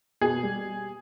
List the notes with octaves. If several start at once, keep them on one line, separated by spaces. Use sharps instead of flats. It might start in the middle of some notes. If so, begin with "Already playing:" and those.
B2 G#4
G3